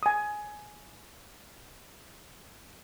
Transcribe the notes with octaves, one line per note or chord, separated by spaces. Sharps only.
G#5 D#6